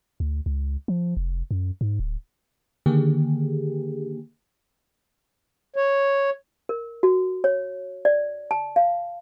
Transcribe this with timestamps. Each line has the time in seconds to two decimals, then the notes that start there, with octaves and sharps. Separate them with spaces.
0.20 D2
0.46 C#2
0.88 F3
1.17 F1
1.51 F#2
1.81 G#2
2.00 D1
2.86 D3 D#3 A#3 G4 G#4
5.76 C#5
6.69 A#4
7.03 F#4
7.44 C#5
8.05 D5
8.51 A5
8.76 F5